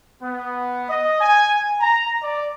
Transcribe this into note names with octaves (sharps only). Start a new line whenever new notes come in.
B3
D#5
G#5
A#5
D5